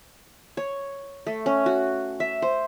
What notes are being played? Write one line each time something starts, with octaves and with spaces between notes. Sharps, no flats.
C#5
A3
C#4
F#4
E5
C5